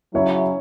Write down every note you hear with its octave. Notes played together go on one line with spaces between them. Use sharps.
C#3 F#3 C#4 E4 C#5 E5